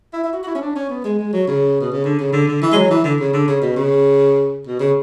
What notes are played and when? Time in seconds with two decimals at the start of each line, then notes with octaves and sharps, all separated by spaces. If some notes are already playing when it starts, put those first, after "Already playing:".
0.13 E4
0.24 E4
0.33 F#4
0.43 F#4
0.47 E4
0.55 C#4
0.61 D4
0.76 C#4
0.90 B3
1.04 G#3
1.19 G#3
1.33 F#3
1.48 C#3
1.81 B2
1.92 C#3
2.04 D3
2.19 C#3
2.33 D3
2.48 D3
2.62 E3
2.72 G#3
2.76 F#3
2.91 E3
3.04 D3
3.20 C#3
3.33 D3
3.48 C#3
3.62 B2
3.77 C#3
4.67 B2
4.80 C#3